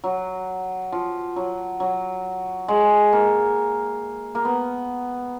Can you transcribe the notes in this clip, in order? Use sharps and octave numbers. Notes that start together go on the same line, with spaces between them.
F#3
F3
F#3
F#3
G#3
A#3
A#3
B3